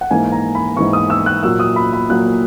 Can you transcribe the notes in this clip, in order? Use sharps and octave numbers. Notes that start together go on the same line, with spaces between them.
F#5
G#2 E3 A#3 G#5
A#5
B5
G#2 E3 A#3 C#6
D#6
E6
F#6
A#2 F#3 A#3 E6
D#6
B5
B5
A#2 F#3 A#3 F#6